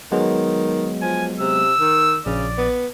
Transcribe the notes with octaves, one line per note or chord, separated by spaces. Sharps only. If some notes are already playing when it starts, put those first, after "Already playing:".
D#3 F#3 G#3 B3
F3 G#5
C3 E6
D#3
A#1 C#3 D5
B3